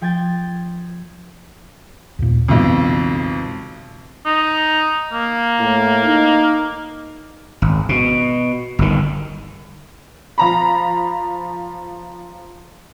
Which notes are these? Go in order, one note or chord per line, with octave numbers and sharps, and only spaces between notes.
F3 G5 G#6 A6
D#2 A#2
B1 F2 C#3 E3 G#3
D#4
A#3
A2
D#4
G#1
B2
G1 D#3
F3 A#5 B5